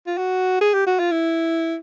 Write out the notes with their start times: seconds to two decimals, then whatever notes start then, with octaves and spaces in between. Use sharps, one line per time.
0.07 F4
0.18 F#4
0.61 G#4
0.74 G4
0.87 F#4
0.99 F4
1.12 E4